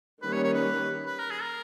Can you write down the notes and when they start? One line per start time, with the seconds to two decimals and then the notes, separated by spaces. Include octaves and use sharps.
0.22 D#3 G3 A#3 C#4 B4
0.33 C#5
0.44 C#5
0.54 B4
1.06 B4
1.19 A#4
1.31 G#4
1.42 A#4